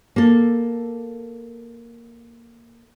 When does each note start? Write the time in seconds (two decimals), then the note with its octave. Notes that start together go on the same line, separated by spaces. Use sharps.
0.16 A#3 A4